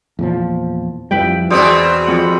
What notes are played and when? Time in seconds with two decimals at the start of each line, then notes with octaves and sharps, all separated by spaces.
0.19 E2 A#2 F3
1.11 F2 F3 G3 E4 B4 G5
1.50 E2 B2 G#3 C4 F#4 C5 D5 D#6
2.06 F2 F#5